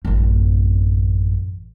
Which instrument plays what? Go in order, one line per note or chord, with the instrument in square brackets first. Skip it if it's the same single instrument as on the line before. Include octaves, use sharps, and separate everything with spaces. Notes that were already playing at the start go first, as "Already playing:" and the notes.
[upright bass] A1 F#2